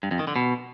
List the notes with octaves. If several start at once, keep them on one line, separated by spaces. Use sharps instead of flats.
G2
F2
D#3
D3
B2